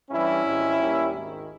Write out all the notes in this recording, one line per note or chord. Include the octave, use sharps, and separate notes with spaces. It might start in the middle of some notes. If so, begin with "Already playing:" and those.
G2 E3 G3 C#4 E4
G#1 G#2 G3
D#2 D#3 G3
G#1 G#2 D#3